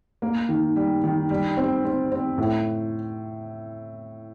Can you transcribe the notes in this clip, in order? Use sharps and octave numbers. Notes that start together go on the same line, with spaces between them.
A#3
D#3
G3
D#3
G3
C4
C4
C4
A2